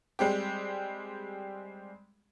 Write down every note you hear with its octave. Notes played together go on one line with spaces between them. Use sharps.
G3 G#3 C4 G4